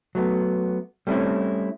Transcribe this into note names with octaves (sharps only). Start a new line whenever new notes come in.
F#3 A3 B3
G3 A3 C4 C#4 E4